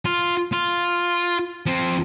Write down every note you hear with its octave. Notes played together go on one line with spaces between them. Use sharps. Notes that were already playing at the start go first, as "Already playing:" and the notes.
F4
F4
F3 C4